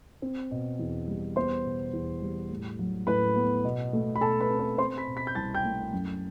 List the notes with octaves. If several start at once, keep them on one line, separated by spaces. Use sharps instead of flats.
C4
B2
E2
G3
B3 C5 C6
B2
E2
G3
A2
F#3
A2 B4 B5
B3
B2
A3
B5
B2 A4 A5
B4 B5
C4
B4 B5
C4 C5 C6
B5 B6
B2
B5 B6
G6
C2 A5 A6
G5 G6
A3
F#2